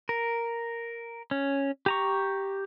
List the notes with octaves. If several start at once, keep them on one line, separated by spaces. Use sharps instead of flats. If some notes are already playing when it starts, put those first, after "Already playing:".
A#4
C#4
G4 A#5 C#6